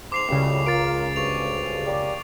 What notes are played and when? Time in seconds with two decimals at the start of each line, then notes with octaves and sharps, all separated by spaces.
0.12 G#2 C6 D6 C7 F7
0.29 C#2 A2 C#3 F#3 G3 C7
0.66 F4 A#4 A6 D7
1.16 D2 G2 C#6 F7
1.87 A#3 G4 D5